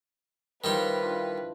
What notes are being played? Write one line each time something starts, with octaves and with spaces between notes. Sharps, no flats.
D#3 F3 G3 E4 G4 B4 C5
E3 D4 F4